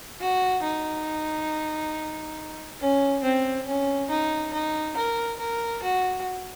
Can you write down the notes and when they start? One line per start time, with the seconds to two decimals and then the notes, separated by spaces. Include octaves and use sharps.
0.21 F#4
0.64 D#4
2.80 C#4
3.23 C4
3.67 C#4
4.10 D#4
4.53 D#4
4.97 A#4
5.39 A#4
5.83 F#4